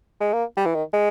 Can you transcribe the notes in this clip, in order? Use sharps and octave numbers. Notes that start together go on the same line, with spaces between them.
G#3
A#3
G3
E3
D#3
G#3